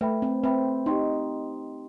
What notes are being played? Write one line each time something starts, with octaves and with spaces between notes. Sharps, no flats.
A3 B4 E5 G5 B5
C4
C4 B4 E5 G5 B5
D#4 G4 D#5 G5 C6